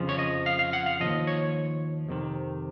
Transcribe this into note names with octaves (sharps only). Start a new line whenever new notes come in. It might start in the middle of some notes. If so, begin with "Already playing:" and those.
Already playing: F2 C#3 F3
C#5
D#5
F5
F5
F#5
F5
D#2 C#3 F3 D#5
C#5
F2 C3 D#3